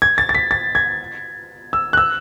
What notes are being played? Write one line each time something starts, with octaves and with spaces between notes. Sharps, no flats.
G#6
A6
A6
B6
A6
G#6
E6
F#6
E6